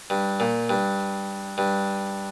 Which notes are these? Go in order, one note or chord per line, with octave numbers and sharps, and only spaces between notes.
G2
A#2
G2
G2